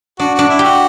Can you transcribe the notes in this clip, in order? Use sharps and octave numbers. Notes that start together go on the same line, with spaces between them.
D4 F#4
D4 F#4
E4
F#4 G4